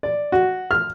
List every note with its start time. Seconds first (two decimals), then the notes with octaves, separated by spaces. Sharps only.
0.03 D5
0.32 F#4
0.71 F6